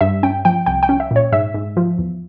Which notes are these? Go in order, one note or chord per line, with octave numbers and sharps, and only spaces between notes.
G2 E5
C#4 G5
F3 G5
C2 G5
G5
C#4
E5
A#2
C#5
G#2 E5
G#2
F3
E2